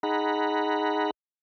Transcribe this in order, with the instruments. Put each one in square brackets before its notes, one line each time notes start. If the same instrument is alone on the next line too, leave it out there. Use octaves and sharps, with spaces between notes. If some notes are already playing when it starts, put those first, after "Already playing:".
[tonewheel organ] D#4 G#4 F#5 A#5 B5